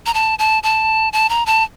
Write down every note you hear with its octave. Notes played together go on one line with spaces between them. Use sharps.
A#5
A5
A5
A5
A5
A#5
A5